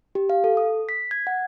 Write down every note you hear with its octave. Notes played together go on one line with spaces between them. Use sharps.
G4
F5
A4
D#6
B6
G#6
F#5